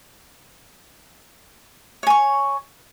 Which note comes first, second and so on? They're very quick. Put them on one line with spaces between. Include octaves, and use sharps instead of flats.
C#5 G#5 C#6